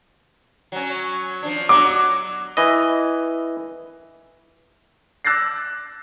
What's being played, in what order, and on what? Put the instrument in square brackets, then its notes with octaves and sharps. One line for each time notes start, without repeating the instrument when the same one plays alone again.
[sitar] F#3 C#4
F3 D4
[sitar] F#3 D4 [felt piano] D6
[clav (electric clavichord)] E3 D#5
[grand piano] D6 E6 F#6 A6 A#6 C7